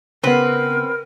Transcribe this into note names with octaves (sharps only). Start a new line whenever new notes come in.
C#3 B3 C4 A#4 B4